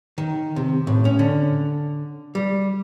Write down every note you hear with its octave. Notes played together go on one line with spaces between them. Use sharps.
D#3
C3
A2
C#4
D3
G3